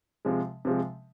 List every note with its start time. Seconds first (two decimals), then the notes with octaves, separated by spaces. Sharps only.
0.25 C3 F3 G#3
0.65 C3 F3 G#3